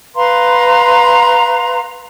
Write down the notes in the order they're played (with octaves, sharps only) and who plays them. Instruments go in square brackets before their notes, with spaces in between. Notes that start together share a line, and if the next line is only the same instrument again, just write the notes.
[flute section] B4 F5 A#5 C6